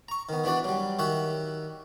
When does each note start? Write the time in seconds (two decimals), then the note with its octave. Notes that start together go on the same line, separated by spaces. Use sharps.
0.08 A#5 C#6
0.29 D#3 B3
0.44 E3 B3 D4 F#4 D5
0.64 F#3 G3
0.99 D#3 F#4 G4 E5 F#5